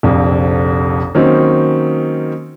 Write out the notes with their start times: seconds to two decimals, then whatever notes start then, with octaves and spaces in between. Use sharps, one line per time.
0.03 F1 A#1 F2
1.15 D#3 F#3 A#3 C4 C#4 D#4